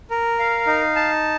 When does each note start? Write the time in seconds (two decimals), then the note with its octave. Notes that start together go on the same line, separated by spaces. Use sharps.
0.10 A#4
0.39 F5
0.67 D#4
0.96 A5